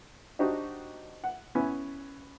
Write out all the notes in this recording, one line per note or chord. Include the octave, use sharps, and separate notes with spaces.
D4 D#4 F#4 G4 C5 D#5
F#5
B3 C#4 E4 G#5